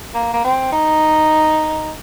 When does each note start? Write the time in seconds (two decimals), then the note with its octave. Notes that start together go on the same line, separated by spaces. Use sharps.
0.14 A#3
0.33 A#3
0.44 C4
0.72 D#4